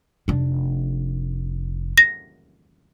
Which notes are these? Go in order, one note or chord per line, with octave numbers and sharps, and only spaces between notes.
F1 D4
A#6